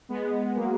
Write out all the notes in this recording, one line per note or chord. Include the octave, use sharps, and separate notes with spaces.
G#3 B3
G#3
F#3 A#3